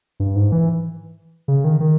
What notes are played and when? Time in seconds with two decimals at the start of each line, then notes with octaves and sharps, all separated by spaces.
0.20 G2
0.36 G#2
0.52 E3
1.48 C#3
1.64 D#3
1.80 D#3